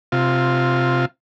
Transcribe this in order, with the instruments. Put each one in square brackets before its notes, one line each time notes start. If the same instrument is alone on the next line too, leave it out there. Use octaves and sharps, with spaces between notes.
[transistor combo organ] C3 F4